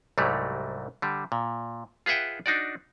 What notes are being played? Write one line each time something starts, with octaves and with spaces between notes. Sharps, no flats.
C2 G#2 F#3 G3 A3
D3 G3
A#2
F4 G#4 B4 E5 F#5 G5
D4 D#4 F#4 D5